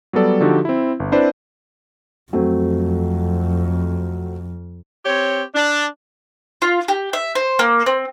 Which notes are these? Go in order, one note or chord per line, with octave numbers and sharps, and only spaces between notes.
F#3 G3 B3 A4 D5
D3 F3 D#4 F#4 G4 A4
C4 E4
G1
C4 D4 E4 B4 C5 D5
F2 F#3 A3 C4
C4 G4 C#5
D4
F4
G4
E5
C5
A#3
C4